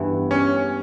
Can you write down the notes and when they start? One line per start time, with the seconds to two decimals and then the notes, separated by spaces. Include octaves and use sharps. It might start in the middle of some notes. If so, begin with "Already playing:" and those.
Already playing: G2 E3 B3 E4
0.31 C#4